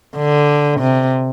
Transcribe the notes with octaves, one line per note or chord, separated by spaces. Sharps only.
D3
C3